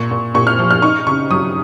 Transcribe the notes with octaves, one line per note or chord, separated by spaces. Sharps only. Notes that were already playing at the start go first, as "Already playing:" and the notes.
Already playing: A#2 C#6
A#2
A#2 C#6
F6
F3
F6
D#4 C#6
C#3 C#6
F#3 D#6